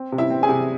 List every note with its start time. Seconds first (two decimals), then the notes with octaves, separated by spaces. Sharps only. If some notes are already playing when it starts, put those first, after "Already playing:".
Already playing: C4
0.12 C3
0.18 E4 E5
0.30 C4
0.43 G#4 G#5
0.49 C3